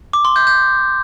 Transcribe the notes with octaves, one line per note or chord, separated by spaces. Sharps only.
D6
C6
G6
G6